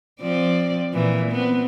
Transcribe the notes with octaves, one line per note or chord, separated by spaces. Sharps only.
F3 C4 D5
A#2 E3
B3 C4